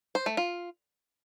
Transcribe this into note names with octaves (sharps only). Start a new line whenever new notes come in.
C5
A3
F4